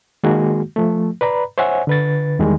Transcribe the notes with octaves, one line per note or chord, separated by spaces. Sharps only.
D#3 G#3 A#3 F#4 G#4
F3 A3
B4 D5 A#5 B5
C5 C#5 E5 F#5 G#5
D3 B4 A6
E2 D#3 G3 G#3